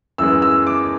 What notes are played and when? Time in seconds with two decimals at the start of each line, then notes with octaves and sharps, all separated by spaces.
0.18 F#2 E3 G#3 B3 E6
0.42 E6
0.67 D6